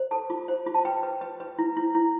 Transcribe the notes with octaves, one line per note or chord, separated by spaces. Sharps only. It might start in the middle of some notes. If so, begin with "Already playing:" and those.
Already playing: C5
A4 A5
F4
C5
F4
A5
B4 G5
B4
B4
B4
E4
E4
E4